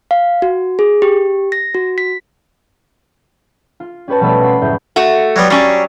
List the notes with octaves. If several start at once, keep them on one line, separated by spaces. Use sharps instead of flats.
F5
F#4
G#4
G4
A#6
F#4
B6
F4
C#4 G4 B4 C#5 A5
B2 F3 G3 A3 B5 E6
F5 F#5 B5 C6
F#1 A2 A3 G6
A3 F#4
F#3 G3 B3
F#3 G3 C#4 D5